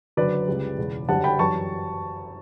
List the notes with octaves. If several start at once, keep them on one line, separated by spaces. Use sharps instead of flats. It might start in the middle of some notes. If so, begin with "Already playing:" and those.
F#1 F#2 D3 F#3 B4 D5
C#2 C#3 G3
E1 E2 C#3
F#1 F#2 D3 G3 F#5 A5
G5 B5
F#2 E3 G3 A5 C#6